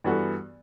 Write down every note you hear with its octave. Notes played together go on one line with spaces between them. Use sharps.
G2 E3 B3 F#4 A4